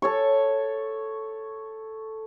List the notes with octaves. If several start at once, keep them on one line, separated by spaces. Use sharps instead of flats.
A4 C#5 C#6